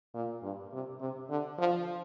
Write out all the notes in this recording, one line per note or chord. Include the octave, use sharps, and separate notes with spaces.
A#2
G2
C3
C3
D3
F3